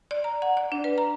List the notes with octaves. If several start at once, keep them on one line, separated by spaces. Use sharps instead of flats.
D5
A#5
F#5
D5
D4
B4
A#5